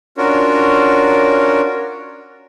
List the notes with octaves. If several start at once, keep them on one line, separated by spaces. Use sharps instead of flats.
C#4 D4 F4 F#4 A#4 C#5